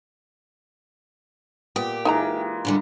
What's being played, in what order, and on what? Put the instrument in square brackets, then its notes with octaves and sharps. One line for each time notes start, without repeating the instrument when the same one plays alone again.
[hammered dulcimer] A#2 [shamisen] B3 [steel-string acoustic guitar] G4
[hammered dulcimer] E3 G#3 A#3 [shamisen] D#4 G#5 A#5
[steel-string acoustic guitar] F#2 D3 G3